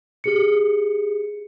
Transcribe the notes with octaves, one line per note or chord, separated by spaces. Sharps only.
G4 G#4 C#7